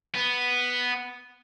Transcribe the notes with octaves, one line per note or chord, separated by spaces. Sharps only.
B3